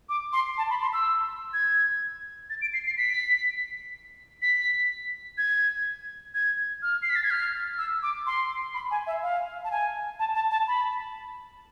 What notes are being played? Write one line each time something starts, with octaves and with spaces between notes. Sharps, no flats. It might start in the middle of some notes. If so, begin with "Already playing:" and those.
D6
C6
A5
B5
C6
E6
G#6
A6
D7
C7
C7
B6
B6
G#6
G#6
F6
C7
B6
A6
G#6
F6
E6
D6
C6
B5
G#5
E5
F5
A5
G#5
A5
A5
A5
B5